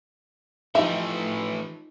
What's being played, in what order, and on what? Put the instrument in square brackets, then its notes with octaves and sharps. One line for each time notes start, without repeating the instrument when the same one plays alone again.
[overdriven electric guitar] E3 A3 [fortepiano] F3 G4 [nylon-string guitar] D#4 [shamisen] E5